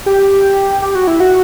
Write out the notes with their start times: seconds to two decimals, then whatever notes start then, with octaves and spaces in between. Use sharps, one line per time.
0.06 G4
0.82 G4
0.95 F#4
1.07 E4
1.20 F#4